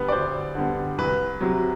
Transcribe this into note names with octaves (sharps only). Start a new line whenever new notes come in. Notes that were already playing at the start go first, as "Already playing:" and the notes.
Already playing: D3 G3 B3 B4
D5
D2 C5
D3 G3 B3
C2 B4
C3 F#3